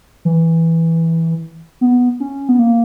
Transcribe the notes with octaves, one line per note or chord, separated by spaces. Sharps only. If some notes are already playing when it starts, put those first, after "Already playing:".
E3
B3
C#4
B3
A#3